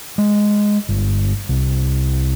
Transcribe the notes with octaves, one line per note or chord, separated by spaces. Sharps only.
G#3
G1
C2